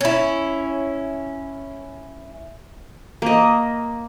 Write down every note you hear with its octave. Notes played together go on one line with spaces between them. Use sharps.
C#4 E4
A#3 D#5